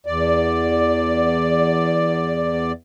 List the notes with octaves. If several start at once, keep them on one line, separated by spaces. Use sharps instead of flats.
E2 D5